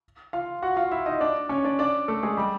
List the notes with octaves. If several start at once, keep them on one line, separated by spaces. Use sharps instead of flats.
F4 F5
F#4 F#5
F4 F5
E4 E5
D#4 D#5
D4 D5
C#4 C#5
D4 D5
D4 D5
A3 A4
G#3 G#4
G3 G4